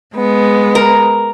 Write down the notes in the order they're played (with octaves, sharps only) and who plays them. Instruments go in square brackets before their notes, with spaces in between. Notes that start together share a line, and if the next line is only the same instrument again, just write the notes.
[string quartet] G#3 B3
[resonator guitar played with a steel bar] A#4